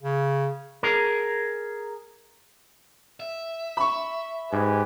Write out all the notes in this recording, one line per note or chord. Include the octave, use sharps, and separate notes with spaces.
C#3
G#4 A#4
E5
B5 C#6
G#2 G4 B4 G#5